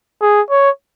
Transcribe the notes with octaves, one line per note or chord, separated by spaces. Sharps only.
G#4
C#5